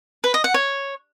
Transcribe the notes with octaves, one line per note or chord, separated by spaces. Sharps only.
B4
D#5
F#5
C#5